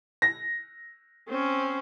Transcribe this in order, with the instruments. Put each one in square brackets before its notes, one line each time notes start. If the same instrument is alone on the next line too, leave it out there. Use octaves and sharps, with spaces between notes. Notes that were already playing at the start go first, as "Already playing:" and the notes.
[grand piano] A#6
[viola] C4 C#4